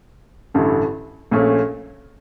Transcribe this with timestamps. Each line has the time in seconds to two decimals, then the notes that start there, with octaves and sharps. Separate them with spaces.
0.54 A1 G2 D3 A3 E4
1.31 A#1 A#2 A3 C#4